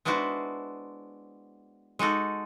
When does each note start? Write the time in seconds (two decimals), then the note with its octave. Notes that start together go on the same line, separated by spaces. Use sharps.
0.05 G#3 B3 D4 E4 F#4 C5
1.99 G#3 D#4 F#4 A4